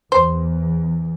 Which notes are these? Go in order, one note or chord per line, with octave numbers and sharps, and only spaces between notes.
E2 C5